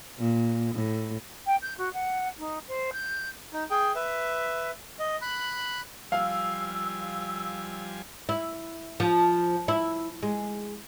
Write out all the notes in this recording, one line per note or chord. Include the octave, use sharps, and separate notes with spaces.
A#2
A2
G5
G6
F#4
F#5
D#4
C5
G6
D#4
G#4 G5
B4 E5
D#5
B5 F#6
F3 G3 F5 G#5 E6
E4
F3
E4
G#3